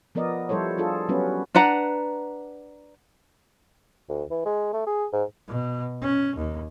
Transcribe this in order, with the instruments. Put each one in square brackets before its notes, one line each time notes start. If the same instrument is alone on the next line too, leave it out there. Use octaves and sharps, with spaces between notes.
[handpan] F3 B3 A#4 D5 D#5
F3 G3 E4 A4 C5 C#5
D4 F4 G#4 A4
F#3 G3 B3 C#4 F#4 B4
[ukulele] D4 B4 F#5 A#5
[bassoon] D2
E3
G#3
A3
G#4
G#2
[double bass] B2
C#4
D#2